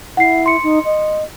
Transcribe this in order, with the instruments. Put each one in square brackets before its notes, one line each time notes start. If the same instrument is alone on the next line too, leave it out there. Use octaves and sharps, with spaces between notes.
[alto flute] E4 [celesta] F#5 C7
[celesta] C6 C#7
[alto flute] D#4
D#5